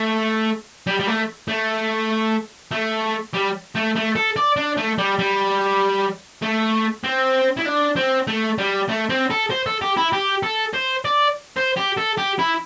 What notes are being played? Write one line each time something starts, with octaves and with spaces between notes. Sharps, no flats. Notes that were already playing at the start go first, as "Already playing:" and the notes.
Already playing: A3
G3
G3
A3
A3
A3
G3
A3
A3
A4
D5
D4
A3
G3
G3
A3
C4
E4
D4
C4
A3
G3
A3
C4
A4
C5
A4
G4
E4
G4
A4
C5
D5
C5
G4
A4
G4
E4